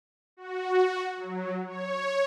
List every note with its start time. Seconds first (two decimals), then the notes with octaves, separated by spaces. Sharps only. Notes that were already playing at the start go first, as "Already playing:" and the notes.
0.37 F#4
1.16 F#3
1.66 C#5